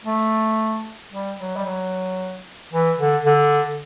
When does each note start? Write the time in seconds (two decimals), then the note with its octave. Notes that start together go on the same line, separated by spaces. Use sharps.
0.05 A3
1.12 G3
1.39 F#3
1.56 G3
1.65 F#3
2.73 E3
2.99 D3
3.26 D3